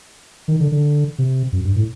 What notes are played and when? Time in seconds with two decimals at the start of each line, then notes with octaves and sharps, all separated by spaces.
0.48 D#3
0.60 D3
0.72 D3
1.18 C3
1.52 F#2
1.64 G2
1.76 A2